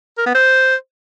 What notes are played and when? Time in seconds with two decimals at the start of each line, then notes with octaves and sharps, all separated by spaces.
0.18 A#4
0.26 B3
0.34 C5